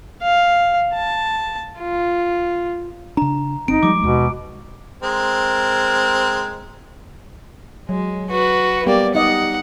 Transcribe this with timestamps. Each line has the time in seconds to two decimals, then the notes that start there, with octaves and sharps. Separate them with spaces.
0.22 F5
0.94 A5
1.80 F4
3.17 C#3 D4 A#5
3.68 F#1 C4 D#4 D7
3.83 F3 G3 G#3 D6
4.02 D#2 B2 G#3
5.03 G#3 C4 A#4
7.89 F#3 G#3
8.30 F#4 B4
8.86 G3 A#3 B3 G4 D5
9.15 D#4 D5 D#5 F#5